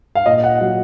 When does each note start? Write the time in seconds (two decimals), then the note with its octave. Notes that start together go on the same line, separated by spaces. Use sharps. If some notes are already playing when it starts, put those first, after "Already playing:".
0.15 F5
0.26 A#2 D#5
0.43 F#5
0.60 F#3